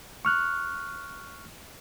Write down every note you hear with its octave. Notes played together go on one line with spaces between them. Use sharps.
C#6 F6 F#6